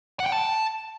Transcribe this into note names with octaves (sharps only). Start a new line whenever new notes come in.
F#5
G5
A5